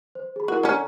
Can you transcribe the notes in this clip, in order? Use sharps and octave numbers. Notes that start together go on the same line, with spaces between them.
C5
G#4 B5
E4 F#4 A#4 F#5
D3 C#4 A#5 F6